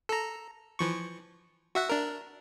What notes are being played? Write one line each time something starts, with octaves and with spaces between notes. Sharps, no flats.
A4 A#5
E3 F3 C#6
F#4 E5 F#5
D4 A#4